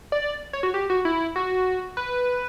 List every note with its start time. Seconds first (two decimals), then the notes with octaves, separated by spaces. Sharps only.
0.12 D5
0.53 C#5
0.63 F#4
0.74 G4
0.90 F#4
1.05 E4
1.36 F#4
1.97 B4